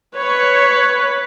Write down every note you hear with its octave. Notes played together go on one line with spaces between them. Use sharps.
B4 C#5